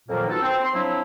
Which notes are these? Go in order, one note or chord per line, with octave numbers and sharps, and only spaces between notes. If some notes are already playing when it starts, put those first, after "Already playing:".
F2 A#2 D#3 F3 F#3 A#3
B3 D#4 F4 F#4 A4
C4
C6
F3 F#3 C4 D4 E4